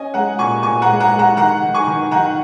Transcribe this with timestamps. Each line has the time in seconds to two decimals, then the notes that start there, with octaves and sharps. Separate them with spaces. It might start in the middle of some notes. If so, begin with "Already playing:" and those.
Already playing: C#4 D#5 G#5
0.14 G#3 F#5 A#5
0.39 A#2 G#5 C#6
0.63 A#2 G#5 C#6
0.82 F#5 A#5
0.88 G#3
1.00 F#5 A#5
1.13 G#3
1.19 F#5 A#5
1.37 D#3 F#5 A#5
1.62 D#3
1.74 G#5 C#6
1.87 D#3
2.11 D#3 F#5 A#5